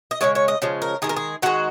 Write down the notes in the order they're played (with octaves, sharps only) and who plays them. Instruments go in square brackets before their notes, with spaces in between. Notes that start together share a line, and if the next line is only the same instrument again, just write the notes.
[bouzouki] D#5
C#3 F3 G#3 C#5
C#5
D#5
C#3 F3 G#3
A#4
D#3 G#3 G#4
A#4
G#4
D#3 G#3 F#4